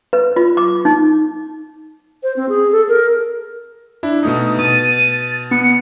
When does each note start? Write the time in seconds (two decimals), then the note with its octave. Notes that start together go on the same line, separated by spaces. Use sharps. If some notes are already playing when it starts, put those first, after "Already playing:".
0.13 B4
0.36 F4
0.57 D6
0.85 D#4
2.23 C5
2.36 C4
2.49 G#4
2.72 A4
2.89 A#4
4.03 D4 E4
4.23 B2 A3 D#4 D#6
4.59 B2 A6 D#7
5.51 B3 C#7